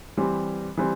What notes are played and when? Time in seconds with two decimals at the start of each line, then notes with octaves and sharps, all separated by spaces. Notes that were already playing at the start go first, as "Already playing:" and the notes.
0.17 E3 G3 C4 G4
0.77 E3 G3 C4